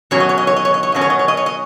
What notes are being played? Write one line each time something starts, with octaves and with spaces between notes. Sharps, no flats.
B2 F#3 C#4 C#5
D#5
C#5
D#5
C#5
D#5
C#5
D#5
C#5
B2 F#3 C#4 D#5
C#5
D#5
C#5
D#5
C#5
D#5